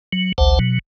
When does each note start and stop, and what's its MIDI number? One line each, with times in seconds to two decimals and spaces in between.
0.13 0.32 54
0.38 0.59 33
0.38 0.59 38
0.38 0.59 72
0.38 0.59 78
0.38 0.59 81
0.59 0.79 47
0.59 0.79 54